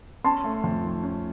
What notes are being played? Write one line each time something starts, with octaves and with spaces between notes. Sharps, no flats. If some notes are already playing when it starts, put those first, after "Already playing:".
C#4 A5 C6
A3
F2
D#3
C#4